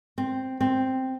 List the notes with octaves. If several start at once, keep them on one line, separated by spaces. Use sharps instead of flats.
C4
C4